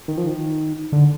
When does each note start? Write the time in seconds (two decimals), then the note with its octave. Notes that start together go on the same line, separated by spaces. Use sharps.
0.08 D#3
0.18 F3
0.27 D#3
0.92 D3